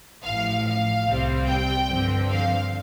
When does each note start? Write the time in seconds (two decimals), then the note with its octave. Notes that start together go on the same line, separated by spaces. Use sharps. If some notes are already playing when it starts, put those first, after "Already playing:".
0.24 A1 A2 F3 F5
0.65 F5
1.06 C2 C3 G3 C4
1.47 G5
1.88 G2 D3 F3 C4
2.29 F5